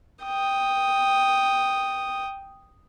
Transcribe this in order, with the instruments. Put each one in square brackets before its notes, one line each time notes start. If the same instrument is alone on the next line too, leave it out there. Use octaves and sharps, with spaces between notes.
[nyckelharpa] G5 D#6